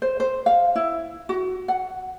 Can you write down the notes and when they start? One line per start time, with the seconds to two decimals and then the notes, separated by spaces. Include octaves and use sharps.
0.02 C5
0.20 C5
0.46 F5
0.76 E4
1.29 F#4
1.68 F#5